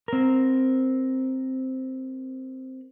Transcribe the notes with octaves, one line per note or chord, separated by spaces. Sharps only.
C4 A#4